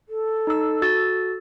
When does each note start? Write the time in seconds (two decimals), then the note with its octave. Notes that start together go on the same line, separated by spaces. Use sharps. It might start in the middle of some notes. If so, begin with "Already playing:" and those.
0.09 A4
0.47 D#4 E6
0.82 F#4 E6 A6